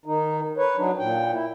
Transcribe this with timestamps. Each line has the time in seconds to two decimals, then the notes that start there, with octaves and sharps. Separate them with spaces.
0.06 D#3 D#4
0.57 B4 C#5
0.77 F#3 D4 D#4
0.99 A#2 G5
1.31 E4